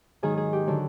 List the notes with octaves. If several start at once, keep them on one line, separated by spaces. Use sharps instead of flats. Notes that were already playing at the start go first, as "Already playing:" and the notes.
G#2 D#3 F#3 G#4
G#4
G4
D3 F#3 F#4